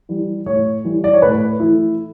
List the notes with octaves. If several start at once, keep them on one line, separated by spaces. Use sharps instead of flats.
E3 G3
A2 C#5
E3 G3
D5
C#5
A2 B4
E3 A3 E4